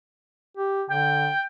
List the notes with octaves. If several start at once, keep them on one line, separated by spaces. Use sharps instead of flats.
G4
D3 G5